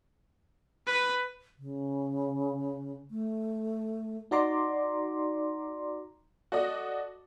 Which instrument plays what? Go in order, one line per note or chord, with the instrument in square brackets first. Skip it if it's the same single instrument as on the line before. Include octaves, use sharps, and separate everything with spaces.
[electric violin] B4
[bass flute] C#3
A3
[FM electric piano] D#4 F#4 D5 A#5 C6 D6
[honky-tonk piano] F#4 A4 D5 D#5